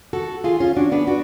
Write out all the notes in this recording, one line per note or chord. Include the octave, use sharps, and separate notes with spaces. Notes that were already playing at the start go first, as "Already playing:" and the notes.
F#4 A4
F4 G#4
C#4 F4
D4 F#4
B3 D4
D4 F#4